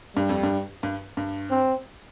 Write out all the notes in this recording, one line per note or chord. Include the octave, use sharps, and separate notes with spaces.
G2 G3
F2
G2
G2
G2
C4